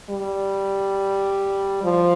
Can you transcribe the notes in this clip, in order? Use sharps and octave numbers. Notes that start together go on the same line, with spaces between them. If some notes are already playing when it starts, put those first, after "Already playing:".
G3
F3